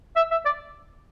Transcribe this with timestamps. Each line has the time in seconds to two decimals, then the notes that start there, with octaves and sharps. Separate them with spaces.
0.16 E5
0.31 E5
0.46 D5